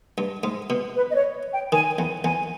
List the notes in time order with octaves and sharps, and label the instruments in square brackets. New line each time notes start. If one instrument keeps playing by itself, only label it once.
[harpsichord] G2
G#2
B2
[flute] B4
D#5
C#5
G5
[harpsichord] D#3 [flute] G#5
[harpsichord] E2
[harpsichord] E2 [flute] G#5